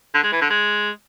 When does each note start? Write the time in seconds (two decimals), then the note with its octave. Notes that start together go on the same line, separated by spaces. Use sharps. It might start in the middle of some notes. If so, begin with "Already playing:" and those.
0.14 D3
0.23 G#3
0.32 E3
0.41 D3
0.50 G#3